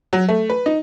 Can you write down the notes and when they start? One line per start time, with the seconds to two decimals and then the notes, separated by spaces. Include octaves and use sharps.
0.13 F#3
0.29 A3
0.50 B4
0.66 D#4